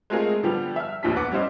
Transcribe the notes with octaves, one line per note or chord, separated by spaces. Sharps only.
G#3 A3 C4 F4 G#4 A#4
D3 F3 G3 B3 G4
E5 F6
F1 A#1 D#2 F3 D4 B6
B3 F#5 D6
G3 C#4 E4 C5 D#5